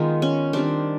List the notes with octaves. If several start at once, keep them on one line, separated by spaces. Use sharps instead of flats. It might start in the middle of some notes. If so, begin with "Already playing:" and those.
Already playing: D#3 G#3 B3 D#4 F4
C#4
D#3 G3 C4 D4